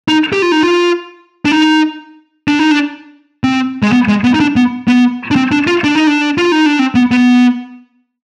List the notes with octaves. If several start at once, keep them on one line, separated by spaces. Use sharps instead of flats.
D#4
G4
F4
D#4
F4
D4
D#4
D4
D#4
D4
C4
G#3
B3
G#3
B3
D#4
D4
B3
B3
D4
C4
D4
F4
D4
D#4
D4
F4
D#4
D4
C4
B3
B3